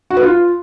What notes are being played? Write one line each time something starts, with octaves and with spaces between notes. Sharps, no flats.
F#4
B4
F4